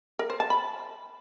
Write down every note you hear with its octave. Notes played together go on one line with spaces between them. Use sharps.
A#4
C5
A5
B5